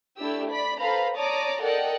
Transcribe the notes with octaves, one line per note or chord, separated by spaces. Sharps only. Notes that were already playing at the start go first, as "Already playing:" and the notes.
A3 D4 E4 G4 E6
D5 B5 B6
A4 B4 C5 F5 A#5 B5
C#5 D5 A5 A#5 D6 D#6
A4 A#4 D5 D#5 F#5 G5